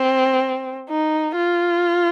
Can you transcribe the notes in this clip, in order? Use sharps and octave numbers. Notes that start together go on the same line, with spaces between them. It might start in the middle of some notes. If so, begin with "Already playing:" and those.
Already playing: C4
D#4
F4